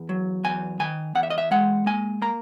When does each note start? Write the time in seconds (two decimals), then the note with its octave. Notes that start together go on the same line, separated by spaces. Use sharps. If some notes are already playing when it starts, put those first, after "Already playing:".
Already playing: E2
0.09 F#3
0.44 E2 G#5
0.80 D#3 G#5
1.15 E2 F#5
1.23 E5
1.30 D#5
1.38 E5
1.51 G#3 F#5
1.86 A#3 G#5
2.22 A#3 A#5